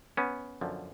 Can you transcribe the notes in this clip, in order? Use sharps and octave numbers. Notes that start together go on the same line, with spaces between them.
B3 C#4
F#2 D3 F3